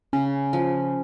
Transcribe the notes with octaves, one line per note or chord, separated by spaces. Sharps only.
C#3 C#4
F3